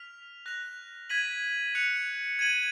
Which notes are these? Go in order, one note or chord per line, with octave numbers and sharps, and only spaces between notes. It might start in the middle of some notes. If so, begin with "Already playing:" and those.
Already playing: F6 B6 F7
F#6 A#6 F7
G#6 B6 D#7 F#7
F#6 C#7 F7
G#6 D#7 F#7